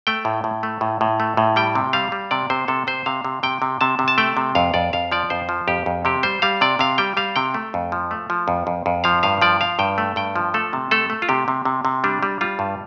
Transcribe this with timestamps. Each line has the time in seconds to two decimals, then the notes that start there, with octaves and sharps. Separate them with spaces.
0.07 A3 G5
0.25 A2
0.44 A2
0.63 A3
0.81 A2
1.01 A2
1.20 A3
1.37 A2
1.56 G3 G5
1.75 C3
1.93 G3 F5
2.12 G3
2.31 C3 D5
2.50 C3 C5
2.68 C3 A4
2.87 C3 C5
3.06 C3 F5
3.25 C3
3.43 C3 G5
3.62 C3
3.81 C3 A5
3.99 C3
4.08 A5
4.18 A3 G5
4.37 C3
4.55 F2 F5
4.74 F2 D5
4.93 F2 F5
5.12 F3 D5
5.30 F2 C5
5.49 F3
5.68 F2 G4
5.86 F2
6.05 C3 G4
6.23 G3 C5
6.42 G3 F5
6.61 C3 D5
6.79 C3 F5
6.98 G3 G5
7.17 G3 F5
7.36 C3 G5
7.54 A3
7.74 F2
7.92 F3
8.11 A3
8.30 F3
8.48 F2
8.67 F2
8.86 F2
9.04 F3 F5
9.23 G2 F5
9.42 F3 D5
9.61 F3 F5
9.79 G2 G5
9.98 A3
10.16 G2 G5
10.36 F3
10.54 A3 A4
10.73 C3
10.91 A3 A4
11.10 A3
11.22 F4
11.29 C3 G4
11.48 C3
11.65 C3
11.85 C3
12.04 G3 D4
12.23 G3
12.41 G3 F4
12.59 G2